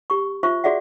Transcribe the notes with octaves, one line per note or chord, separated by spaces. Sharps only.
G4 C#6
F4 C5 E5 C#6
F#4 G#4 D5 E5 F#5